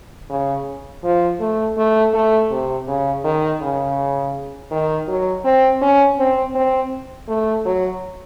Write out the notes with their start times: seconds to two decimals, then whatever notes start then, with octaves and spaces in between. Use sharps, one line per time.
0.30 C#3
1.04 F3
1.40 A3
1.78 A3
2.14 A3
2.51 C3
2.87 C#3
3.24 D#3
3.61 C#3
4.71 D#3
5.08 F#3
5.45 C4
5.82 C#4
6.19 C4
6.55 C4
7.28 A3
7.65 F#3